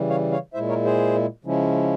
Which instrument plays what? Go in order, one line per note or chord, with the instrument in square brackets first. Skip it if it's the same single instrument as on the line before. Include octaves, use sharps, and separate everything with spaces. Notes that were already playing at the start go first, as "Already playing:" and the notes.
Already playing: [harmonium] C#3 E3 G3
C#5 F5
C#5 F5
A#2 G#3 E4 C5 E5
A#4 C#5
G#4 C5
C#3 F3 G#3 C#4 E4